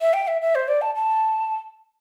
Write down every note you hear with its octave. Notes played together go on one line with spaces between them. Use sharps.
E5
G5
E5
E5
C5
D5
A5
A5